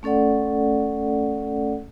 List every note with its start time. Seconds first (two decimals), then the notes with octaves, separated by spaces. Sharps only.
0.03 A3 C#4 A4 D5 F#5